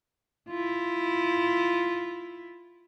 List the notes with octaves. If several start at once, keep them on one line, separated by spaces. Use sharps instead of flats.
E4 F4